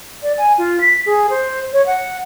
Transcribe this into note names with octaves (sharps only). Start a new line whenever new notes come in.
D5
G#5
F4
B6
G#4
C5
C#5
F#5